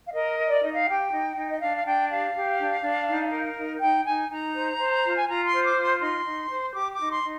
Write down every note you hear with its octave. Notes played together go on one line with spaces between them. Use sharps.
F5
A#4 D#5
A#4
D5
D#4 D#5
F5
G4 G5
D#4
D#4
D#5
D4 F5
F5
D4 G5
G4 F5
G4
D4
D4
D#4
A#4
D#4
D#4 G5
D#4 G#5
D#4 A#5
C5
C5
F4
G#5
F4 A#5
C6
C5
D6
F4
C6
D#4 C6
D#4
C5
G4 D6
D6
D#4
C6
D#4